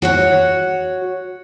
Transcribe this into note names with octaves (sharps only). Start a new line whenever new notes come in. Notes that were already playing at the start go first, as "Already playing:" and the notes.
F#4 C#5 F#5